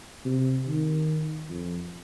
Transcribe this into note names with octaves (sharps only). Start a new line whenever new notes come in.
C3
D#3
F2